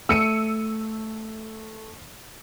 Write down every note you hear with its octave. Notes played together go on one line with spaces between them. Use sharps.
A3 E6 C#7 D#7